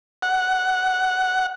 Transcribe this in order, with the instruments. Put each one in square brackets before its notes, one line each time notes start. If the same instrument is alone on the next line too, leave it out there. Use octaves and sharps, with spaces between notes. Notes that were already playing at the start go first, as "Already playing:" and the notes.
[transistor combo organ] F#5